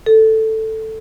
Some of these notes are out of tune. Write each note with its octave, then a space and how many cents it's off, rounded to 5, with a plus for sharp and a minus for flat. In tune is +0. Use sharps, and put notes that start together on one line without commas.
A4 +5